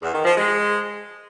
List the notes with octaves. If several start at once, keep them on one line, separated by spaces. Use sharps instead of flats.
E2
D#3
F3
G#3